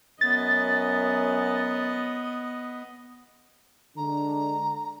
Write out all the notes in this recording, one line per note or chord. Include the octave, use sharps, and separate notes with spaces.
F#2 B3 D#5 A6
D3 G#3 D4 A#5